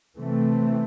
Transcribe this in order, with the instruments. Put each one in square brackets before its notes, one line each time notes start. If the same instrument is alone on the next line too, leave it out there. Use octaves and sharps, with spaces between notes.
[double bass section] C3 E3 A3 C4